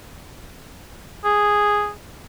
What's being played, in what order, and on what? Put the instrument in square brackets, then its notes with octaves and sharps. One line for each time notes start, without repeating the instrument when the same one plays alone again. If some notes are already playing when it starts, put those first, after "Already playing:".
[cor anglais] G#4